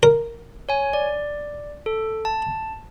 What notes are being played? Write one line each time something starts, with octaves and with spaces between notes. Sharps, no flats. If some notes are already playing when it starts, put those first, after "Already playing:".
A#4
C#5 G#5
D5
A4
A5